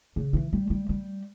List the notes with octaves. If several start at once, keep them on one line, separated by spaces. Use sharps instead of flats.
C#3
E3
G3
G3
G3